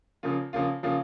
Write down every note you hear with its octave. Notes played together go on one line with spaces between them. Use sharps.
C#3 F3 A#3 F4
C#3 F3 A#3 F4
C#3 F3 A#3 F4